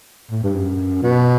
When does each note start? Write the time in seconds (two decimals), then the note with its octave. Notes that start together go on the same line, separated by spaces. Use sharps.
0.31 A2
0.43 G2
0.55 F#2
1.03 B2